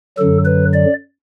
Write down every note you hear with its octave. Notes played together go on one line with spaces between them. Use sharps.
F#2 D3 F#3 A4
B4
D5